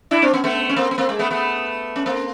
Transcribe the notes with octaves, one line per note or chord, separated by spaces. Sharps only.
D4 E4
C4 D4
B3 C#4
A3 B3
C#4
A#3 C4
B3
A#3 C4
G#3 A#3
A3 B3
A3 B3
C#4
A#3 C4